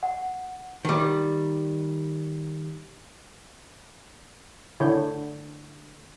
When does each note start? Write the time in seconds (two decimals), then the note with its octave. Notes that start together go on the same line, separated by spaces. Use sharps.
0.03 F#5
0.85 D#3 G3
4.80 D3 E4 C#5 G6